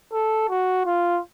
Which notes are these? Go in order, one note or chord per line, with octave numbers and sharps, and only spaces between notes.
A4
F#4
F4